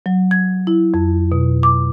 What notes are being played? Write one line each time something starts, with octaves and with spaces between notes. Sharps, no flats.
F#3
G#6
E4
F2
B2
D6